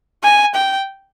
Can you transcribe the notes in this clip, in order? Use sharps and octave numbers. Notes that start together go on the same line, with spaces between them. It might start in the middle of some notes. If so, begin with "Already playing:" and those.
G#5
G5